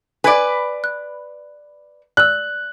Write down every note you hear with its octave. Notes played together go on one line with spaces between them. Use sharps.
B4 D5 G#5 G#6 D7
F#6
D5 E6 F#6